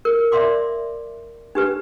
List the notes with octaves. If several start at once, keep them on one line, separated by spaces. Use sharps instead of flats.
A#4
D5 E5 F5 C6 D6
D4 G4 B4